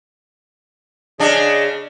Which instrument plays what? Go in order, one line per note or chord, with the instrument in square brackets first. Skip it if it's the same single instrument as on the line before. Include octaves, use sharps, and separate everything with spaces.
[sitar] C#3 D4 [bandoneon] G#4 D#5